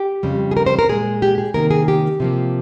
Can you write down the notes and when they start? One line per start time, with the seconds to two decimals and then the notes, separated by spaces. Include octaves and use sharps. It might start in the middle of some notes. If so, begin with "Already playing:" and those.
Already playing: G4
0.23 F2 C#3 G3
0.51 G#4
0.57 A#4
0.66 C5
0.79 A#4
0.89 A#2 G#3 G#4
1.22 G4
1.38 G#4
1.54 C3 D#3 A#3 A#4
1.71 G#4
1.88 G4
2.20 C3 F3 A#3